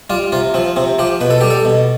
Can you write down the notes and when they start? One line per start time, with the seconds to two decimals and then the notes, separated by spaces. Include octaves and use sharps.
0.10 G3 F4
0.32 C3 F4
0.54 F3 C4
0.76 C3 C4
0.99 F3 G4
1.21 B2 B4
1.30 A4
1.41 G3 G4
1.50 A4
1.65 B2